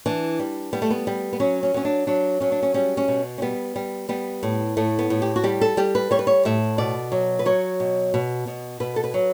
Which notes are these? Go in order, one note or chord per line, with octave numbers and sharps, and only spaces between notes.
E3 D4
G3
G3 B3
A3
B3
G3
B3
F#3 C#4
C#4
F#3 C#4
D4
F#3 D4
F#3 C#4
D4
C#4
G3 C#4
C#4
B2
C#4
G3 B3
G3
G3 B3
A2
A2 A3
B3
A2
G4
F#4
G3 G4
A4
G3 G4
B4
G3 C#5
B4
C#5
A2 E5
B2 D5
F#3
B4
F#3 C#5
B2
B2
B2
B2 B4
A4
B4
F#3